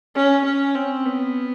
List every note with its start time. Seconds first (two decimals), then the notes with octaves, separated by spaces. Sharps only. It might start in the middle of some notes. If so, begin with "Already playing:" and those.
0.15 C#4
0.45 C#4
0.75 C4
1.06 B3